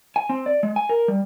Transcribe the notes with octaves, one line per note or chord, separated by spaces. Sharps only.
G#5
C4
D5
G#3
G#5
A#4
G3